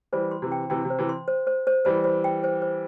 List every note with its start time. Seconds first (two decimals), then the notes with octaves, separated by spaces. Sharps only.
0.13 E3 G3 C5
0.31 C6
0.42 C3 E3
0.52 G5
0.70 C3 E3 G5
0.85 C3
0.90 C5
0.98 C3 E3
1.09 C6
1.28 C5
1.47 C5
1.67 C5
1.85 E3 G3 C5
2.04 C5
2.24 G5
2.44 C5
2.62 C5